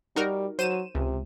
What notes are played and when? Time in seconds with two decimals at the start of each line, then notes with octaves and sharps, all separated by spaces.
0.16 G3 D#4 F#4 A#4
0.59 F#3 C5 D#7 E7
0.95 C#2 C3